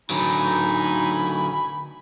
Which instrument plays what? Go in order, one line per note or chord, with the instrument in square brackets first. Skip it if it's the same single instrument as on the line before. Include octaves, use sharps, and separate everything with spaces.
[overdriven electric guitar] D3 F#3 [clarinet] D#4 [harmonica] G#5 B5